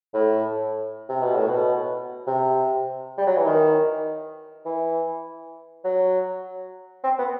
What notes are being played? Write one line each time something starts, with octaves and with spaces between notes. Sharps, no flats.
A2
C3
B2
A2
B2
C3
G3
F#3
E3
D#3
E3
F#3
C4
B3